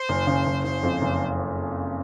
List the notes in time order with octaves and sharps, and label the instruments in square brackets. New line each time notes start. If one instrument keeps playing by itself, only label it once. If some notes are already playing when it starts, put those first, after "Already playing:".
Already playing: [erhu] C5
[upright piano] F#1
C#3
F#1
[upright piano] F#1 [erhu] C5
[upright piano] F2
F#1